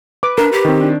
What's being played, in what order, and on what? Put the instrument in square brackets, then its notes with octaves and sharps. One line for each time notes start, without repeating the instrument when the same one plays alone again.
[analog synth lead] B4 [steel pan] D6
[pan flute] D4 [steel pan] A#4
[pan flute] G4
[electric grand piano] D#3 C4
[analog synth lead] D4